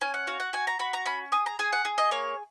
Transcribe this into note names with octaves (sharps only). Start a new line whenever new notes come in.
C#4 G#5
F#5
F#4 F5
F#5
F#4 G#5
A#5
F#4 B5
A#5
C#4 B5
G#4 D#6
A#5
G#4 G#5
F#5
G#4
D#5
A#3 C#5